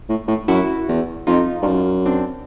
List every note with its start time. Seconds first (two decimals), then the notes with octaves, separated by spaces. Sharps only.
0.09 A2
0.28 A2
0.48 F#2 E4 F#4
0.88 E2
1.27 F2 D#4 F4
1.62 G2
1.67 F#2
2.06 C4 D4